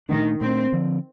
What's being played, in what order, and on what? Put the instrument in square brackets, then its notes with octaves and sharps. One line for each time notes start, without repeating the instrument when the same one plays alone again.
[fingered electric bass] A#2 A3 D4 [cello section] D#3
[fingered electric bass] A#2 A3 D4 [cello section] C4
[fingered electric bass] D3 F3 C4